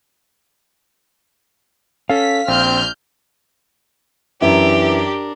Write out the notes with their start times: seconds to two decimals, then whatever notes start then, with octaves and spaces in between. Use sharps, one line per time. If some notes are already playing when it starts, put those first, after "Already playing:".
2.10 C#4 A4 F5 B6
2.48 A#1 C4 F6 G6
4.42 F#2 E3 D4 G4 A#4 E5